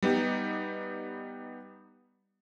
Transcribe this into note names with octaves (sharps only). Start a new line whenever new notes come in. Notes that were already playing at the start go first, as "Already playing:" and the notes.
G3 B3 D#4 G4